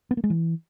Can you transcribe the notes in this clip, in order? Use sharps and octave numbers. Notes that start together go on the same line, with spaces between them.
B3
A#3
G#3
E3